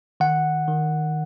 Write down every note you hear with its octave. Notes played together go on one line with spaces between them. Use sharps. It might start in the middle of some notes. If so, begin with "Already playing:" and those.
D#3 F#5
D#3